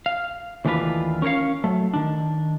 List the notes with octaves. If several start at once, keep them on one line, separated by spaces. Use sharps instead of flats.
F5
D#2 E3 A3 D4 F4 B4
C#4 A#4 C5 C#5 F5
F#3 A3
D#3 D4